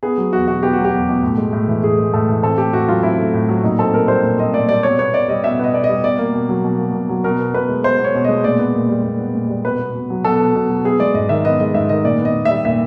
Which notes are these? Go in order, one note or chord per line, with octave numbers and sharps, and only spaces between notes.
B3 G#4
F#3
E2 F#4
B2 F#4
B3 G4
F#4
F#3
G4
E2
B2
A2
G#3
A2
E3
A2 G#4
G#3
A2 A4
E3
C4 A4
A3 G4
A2 F#4
F#3 F4
C4 E4
A3
A2
F#3
A#2 D#4
C4 A4
A#2 A#4
G3 C5
A#2
C4 D#5
A#2 D5
G3 D5
B2 C#5
B3 C#5
B2 D5
G3 D#5
B2 E5
B3 D#5
B2 D5
D#5
G3
B2 D5
A#3
B2
F#3
B2
A#3
B2
F#3
B2 A#4
B3
B2 B4
G#3
B2 C5
B3
C#5
B2
G#3 D#5
A#2 D5
B3
A#2
G3
A#2
B3
A#2
G3
B2 B4
B3
B2
F#3
B2 A4
B3
B2
F#3
B3 G#4
G#3 D5
G#2 D#5
D#3 E5
B3 D#5
G#3 D#5
G#2 E5
D#3 D#5
A#2 D5
B3
D#5
A#2
G3 E5
A#2 E5